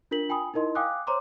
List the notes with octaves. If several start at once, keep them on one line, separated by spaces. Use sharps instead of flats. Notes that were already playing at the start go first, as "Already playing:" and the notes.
D4 F4 A#4 B6 F#7
F4 G5 G#5 B5 D#6
D#4 E4 A#4 D#5 C6
F5 G5 G#5 D6 D#6 F#6
C5 C#5 A#5 C6 D6